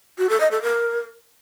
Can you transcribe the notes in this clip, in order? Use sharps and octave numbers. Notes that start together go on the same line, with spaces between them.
F#4
A4
D#5
A4
A#4